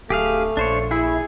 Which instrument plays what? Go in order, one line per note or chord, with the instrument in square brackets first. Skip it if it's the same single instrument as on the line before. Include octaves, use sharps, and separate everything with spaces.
[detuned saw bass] D1 [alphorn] A3 [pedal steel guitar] G4 G#4 F5
[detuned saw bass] A#1 [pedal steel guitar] D4 C5 C#5
[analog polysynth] E4 [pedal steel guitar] G#4